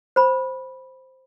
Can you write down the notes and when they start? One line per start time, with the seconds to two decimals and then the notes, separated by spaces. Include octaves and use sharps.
0.16 C5 B5